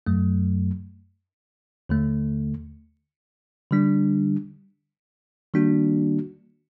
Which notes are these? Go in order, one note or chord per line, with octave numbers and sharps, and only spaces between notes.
F#2 F#3 A3
D#2 D3 A3
D3 G3 D4
D#3 G3 A#3 D4 F#4